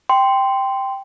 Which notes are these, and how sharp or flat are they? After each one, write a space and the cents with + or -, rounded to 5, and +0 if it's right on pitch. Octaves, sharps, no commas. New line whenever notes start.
G5 +0 C6 -10